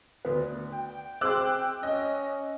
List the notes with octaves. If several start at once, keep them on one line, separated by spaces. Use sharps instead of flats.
D2 B3
G5
C4 G#4 C6 D6 E6 F#6
C#4 D#5